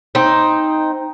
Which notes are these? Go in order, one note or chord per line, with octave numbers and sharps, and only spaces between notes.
C4 D#4